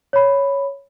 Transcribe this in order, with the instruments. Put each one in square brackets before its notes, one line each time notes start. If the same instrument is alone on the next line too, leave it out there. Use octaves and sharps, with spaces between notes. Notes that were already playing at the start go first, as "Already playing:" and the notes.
[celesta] C#5 B5